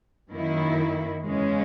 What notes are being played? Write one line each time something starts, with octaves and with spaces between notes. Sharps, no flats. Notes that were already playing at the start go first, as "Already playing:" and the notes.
F#2 D#3 A#3 E4
E2 C#3 G#3 C#4